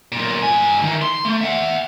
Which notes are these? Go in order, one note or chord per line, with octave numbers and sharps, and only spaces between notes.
B1 A#2
G2 G#5
D#3 E3
C6
A3
E5 F#5